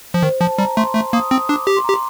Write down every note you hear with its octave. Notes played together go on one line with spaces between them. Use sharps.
F3
D#3 C5
F3 A5
G3 A#5
A3 C6
A3
A#3 D#6
C4 D#6
D4 D6
G4 D6
C6
A#5
G4
C6